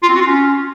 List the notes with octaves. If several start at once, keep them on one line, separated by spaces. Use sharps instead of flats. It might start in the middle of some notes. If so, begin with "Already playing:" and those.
F4
C4
F#4
F4
C#4